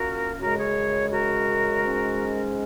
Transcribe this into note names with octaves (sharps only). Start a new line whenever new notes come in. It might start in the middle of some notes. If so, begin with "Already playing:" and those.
Already playing: A#2 A#3 C#4 F#4 A#4
F#2 C#3 G#3 C#4 F#4 A#4
G#4 C#5
F#4 A#4
G#2 G#3 C#4